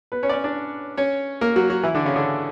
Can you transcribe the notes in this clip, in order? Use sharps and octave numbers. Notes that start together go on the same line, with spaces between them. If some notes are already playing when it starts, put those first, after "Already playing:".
B3 B4
C#4 C#5
D5
C#4 C#5
D4 D5
C#4 C#5
A#3 A#4
F#3 F#4
F#3 F#4
E3 E4
D3 D4
C#3 C#4
D3 D4